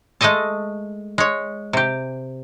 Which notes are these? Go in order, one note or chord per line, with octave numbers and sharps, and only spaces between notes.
G#3 A3 A4 D#5 A5
G#3 C#5
C3 G4